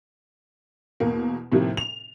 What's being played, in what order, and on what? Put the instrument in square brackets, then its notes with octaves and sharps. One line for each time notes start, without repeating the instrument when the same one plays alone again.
[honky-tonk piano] E2 B2 A#3
A2 C3 D#3 F3 G3 A#3
F7